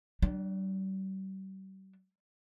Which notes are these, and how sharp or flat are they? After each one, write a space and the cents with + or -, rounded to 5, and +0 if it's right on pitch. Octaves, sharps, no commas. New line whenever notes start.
G3 -40 D4 +10